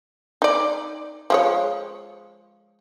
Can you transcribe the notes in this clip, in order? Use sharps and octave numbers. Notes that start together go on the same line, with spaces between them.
D#4 D5
F3 G#3 C#5